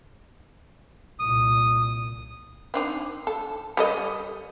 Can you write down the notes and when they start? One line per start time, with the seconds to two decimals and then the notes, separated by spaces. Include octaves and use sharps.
1.20 C2 A#2 D#6
2.74 C4 D4 D#4
3.27 A4
3.77 G3 A4 D#5